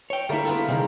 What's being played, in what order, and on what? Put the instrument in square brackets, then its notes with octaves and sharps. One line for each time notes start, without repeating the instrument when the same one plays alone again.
[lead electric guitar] C#5 G5
[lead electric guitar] D3 E4 [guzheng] G3 A3 A#3
[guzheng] B3 F4 A4
[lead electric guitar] C3 D#3 [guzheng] G3 G#3 A#4